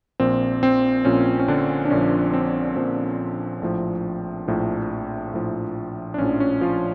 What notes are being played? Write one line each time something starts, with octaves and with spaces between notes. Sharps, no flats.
A#1 A#2 F3 C4
C4
A#1 A#2 F3 C#4
C#4
D3 D4
D4
A#1 A#2 F3 C#4
C4
A#1 A#2 F3 C4
A#1 A2 F3
A#1 A2 F3
A#1 A2 F3
D4
A#1 A2 F3 C#4
C#4
F3 F4